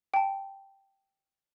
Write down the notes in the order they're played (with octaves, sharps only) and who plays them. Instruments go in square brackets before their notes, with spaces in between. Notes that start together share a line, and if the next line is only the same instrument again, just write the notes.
[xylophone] G5 A5